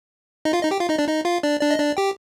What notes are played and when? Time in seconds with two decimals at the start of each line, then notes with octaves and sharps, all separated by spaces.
0.45 D#4 D#5
0.53 F4 F5
0.62 D#4 D#5
0.71 G4 G5
0.80 F4 F5
0.89 D#4 D#5
0.98 D4 D5
1.08 D#4 D#5
1.25 F4 F5
1.43 D4 D5
1.61 D4 D5
1.71 D#5
1.79 D4 D5
1.97 G4 G5